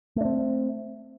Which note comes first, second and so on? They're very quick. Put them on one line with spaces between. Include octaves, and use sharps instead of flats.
A3 D4 C4